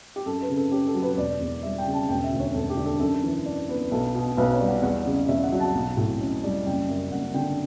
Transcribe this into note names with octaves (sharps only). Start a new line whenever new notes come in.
G4
F#2 A4
B4
C#3
A4
C#4 G4
A4
F#3
B4
E1 D5
E2
G3 E5
G5
C#3
A5
E1 G5
E5
D2
C#5
E1 A4
G4
D3
A4
F#2 A4
E3
D4
B3
B1 A4
B2
B1 B4
C#5
G3
F#5
E2 F#5
C#3
E2 E5
F#5
F#3
A5
B1
A2
C#4
G3
F#1 G5
F#2
F#1 F#5
D3 G5